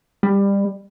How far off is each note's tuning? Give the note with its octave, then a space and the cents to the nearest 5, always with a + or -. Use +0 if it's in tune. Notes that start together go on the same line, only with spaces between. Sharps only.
G3 +20